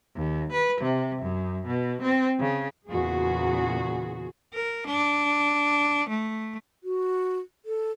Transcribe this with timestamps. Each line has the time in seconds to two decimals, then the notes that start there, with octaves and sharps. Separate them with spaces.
0.15 D#2
0.52 B4
0.81 C3
1.22 F#2
1.67 B2
2.02 C4
2.40 C#3
2.88 E2 A#2 C#3 F#4 G#4
4.54 A#4
4.87 D4
6.09 A3
6.84 F#4
7.65 A4